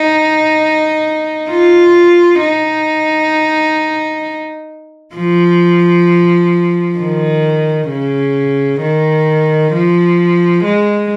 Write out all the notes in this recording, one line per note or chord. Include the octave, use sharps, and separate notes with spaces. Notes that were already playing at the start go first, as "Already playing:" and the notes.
Already playing: D#4
F4
D#4
F3
D#3
C#3
D#3
F3
G#3